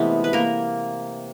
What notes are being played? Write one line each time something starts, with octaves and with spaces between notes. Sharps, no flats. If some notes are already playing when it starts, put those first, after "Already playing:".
Already playing: C3 E3 G#3 A3 B3
B4
A#3 A#4